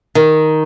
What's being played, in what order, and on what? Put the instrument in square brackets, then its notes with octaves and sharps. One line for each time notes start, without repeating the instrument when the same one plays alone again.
[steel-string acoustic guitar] D#3